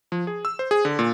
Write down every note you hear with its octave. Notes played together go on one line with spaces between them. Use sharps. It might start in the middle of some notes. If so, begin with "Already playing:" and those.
F3
G#4
E6
C5
G#4
D3
A#2